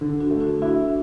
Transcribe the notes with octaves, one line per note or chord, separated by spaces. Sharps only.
D3
D4 F#4
A3
D4 F#4
D4 E4 F#4